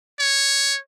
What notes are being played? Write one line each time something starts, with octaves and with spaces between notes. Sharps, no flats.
C#5